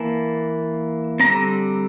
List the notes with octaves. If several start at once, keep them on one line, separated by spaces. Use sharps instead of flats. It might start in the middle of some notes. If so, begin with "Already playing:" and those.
Already playing: E3 A#3 A5
D3 G3 C4 A#5